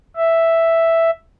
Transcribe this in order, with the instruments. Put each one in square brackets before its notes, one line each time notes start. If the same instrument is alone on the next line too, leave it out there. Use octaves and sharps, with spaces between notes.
[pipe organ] E5